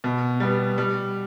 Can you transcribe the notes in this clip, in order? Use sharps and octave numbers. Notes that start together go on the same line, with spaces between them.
B2
G3 B3
G3